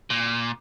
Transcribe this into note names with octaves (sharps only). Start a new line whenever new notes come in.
A#2